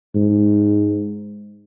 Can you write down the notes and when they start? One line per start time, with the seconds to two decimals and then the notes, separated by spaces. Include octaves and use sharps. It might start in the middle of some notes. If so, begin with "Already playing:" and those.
0.15 G#2